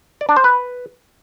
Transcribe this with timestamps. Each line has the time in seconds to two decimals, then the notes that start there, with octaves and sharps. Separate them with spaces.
0.21 D5
0.29 D4
0.36 C5
0.44 B4